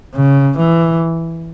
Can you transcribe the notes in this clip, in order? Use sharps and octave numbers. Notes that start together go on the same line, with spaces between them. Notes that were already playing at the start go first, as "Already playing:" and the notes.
C#3
E3